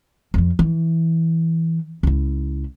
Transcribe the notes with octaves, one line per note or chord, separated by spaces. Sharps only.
F2 F3
E3
C#2 E4